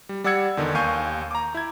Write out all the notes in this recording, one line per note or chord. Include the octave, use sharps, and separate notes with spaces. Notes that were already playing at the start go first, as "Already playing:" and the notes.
G3
G3 D5 F#5 E6 G#6 C#7
E2 D3 D#3
D#2 F5 G#5 C#6 G6 D#7
A#5 D6
E4 G#6